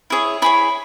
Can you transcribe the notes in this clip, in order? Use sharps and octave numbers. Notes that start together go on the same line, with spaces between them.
E4 G#4 C#5
E4 G#4 C#5 B5